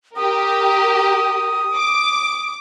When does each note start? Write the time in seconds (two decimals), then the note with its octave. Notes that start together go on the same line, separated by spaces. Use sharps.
0.16 G4 A#4 D#6
1.76 D6